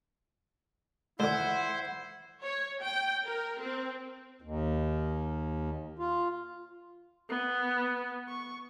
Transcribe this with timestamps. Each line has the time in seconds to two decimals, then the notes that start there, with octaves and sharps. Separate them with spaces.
1.20 C#2 D3 E4 C5 F#5
2.43 C#5
2.82 G5
3.25 A#4
3.61 C4
4.42 D#2
5.99 F4
7.29 B3
8.28 C#6